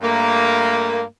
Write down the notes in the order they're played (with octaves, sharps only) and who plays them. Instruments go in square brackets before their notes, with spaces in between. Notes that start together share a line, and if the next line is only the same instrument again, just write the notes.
[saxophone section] G2 A3 A#3